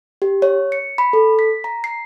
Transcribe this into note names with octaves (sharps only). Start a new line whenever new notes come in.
G4
C#5
C#7
B5
A4
B6
A#5
C7